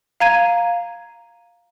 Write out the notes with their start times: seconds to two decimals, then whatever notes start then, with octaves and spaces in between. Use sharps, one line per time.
0.20 F5 A#5 G#6 D#7